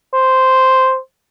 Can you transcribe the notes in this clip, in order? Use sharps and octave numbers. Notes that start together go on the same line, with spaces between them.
C5